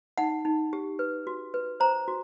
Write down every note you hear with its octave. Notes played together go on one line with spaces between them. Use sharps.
D#4 F#5
D#4
G4
B4
F#4
B4
C5 A#5
F#4